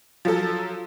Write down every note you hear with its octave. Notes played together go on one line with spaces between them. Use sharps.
F3 F#3 A4